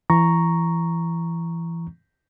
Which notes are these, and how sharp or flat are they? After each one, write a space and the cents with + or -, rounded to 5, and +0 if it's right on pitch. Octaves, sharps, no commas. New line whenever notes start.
E3 +25 A#5 +0 C#6 +0